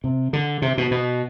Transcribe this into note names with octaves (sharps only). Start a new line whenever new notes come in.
C3
D3
C3
B2
B2